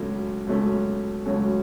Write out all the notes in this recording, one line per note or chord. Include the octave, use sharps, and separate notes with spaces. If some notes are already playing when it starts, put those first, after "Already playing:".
Already playing: C#2 B2 F#3 A3 C#4
C#2 B2 F#3 A3 C#4
C#2 B2 F#3 A3 C#4